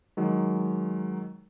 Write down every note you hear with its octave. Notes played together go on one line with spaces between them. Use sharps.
D#3 F#3 G#3